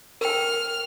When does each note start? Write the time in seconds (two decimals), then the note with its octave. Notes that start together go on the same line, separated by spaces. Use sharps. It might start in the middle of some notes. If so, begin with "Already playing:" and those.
0.21 A#4 G5 F6